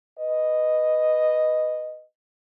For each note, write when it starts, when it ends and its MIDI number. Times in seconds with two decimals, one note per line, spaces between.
0.19 2.04 71
0.19 2.04 75